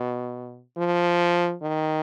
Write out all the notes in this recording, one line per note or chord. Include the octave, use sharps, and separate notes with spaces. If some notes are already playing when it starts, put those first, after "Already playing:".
Already playing: B2
F3
D#3